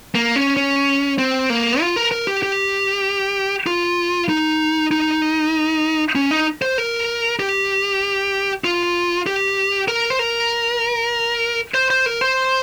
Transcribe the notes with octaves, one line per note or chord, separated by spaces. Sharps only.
A#3
C#4
C#4
C4
A#3
F4
A#4
A#4
G4
G4
F4
D#4
D#4
C#4
D#4
C5
A#4
G4
F4
G4
A#4
C5
A#4
C5
C5
A#4
C5